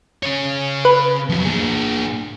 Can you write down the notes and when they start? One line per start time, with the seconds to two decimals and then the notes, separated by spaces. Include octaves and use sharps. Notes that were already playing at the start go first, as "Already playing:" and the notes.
0.23 C#3 C#5
0.85 B4
1.29 F2 F#3
1.45 A#2 G#4